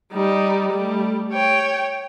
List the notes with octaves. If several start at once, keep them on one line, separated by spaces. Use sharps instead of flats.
G3 D#4
G3 A3
C#5 G5